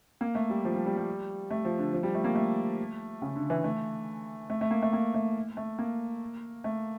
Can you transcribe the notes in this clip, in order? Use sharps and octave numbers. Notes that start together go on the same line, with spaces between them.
A#3
A3
G3
F3
G3
G3
G3
A3
F3
D3
F3
G3
A3
A#3
A3
C#3
D3
E3
A3
A3
A3
A#3
A3
A#3
A3
A3
A#3
A3